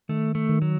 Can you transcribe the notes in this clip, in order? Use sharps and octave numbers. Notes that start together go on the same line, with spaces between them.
D#3 A3
A3
D#3
F#3